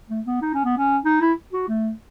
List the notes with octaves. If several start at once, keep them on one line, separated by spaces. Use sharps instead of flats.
A3
B3
D#4
C#4
B3
C#4
D#4
E4
F#4
A3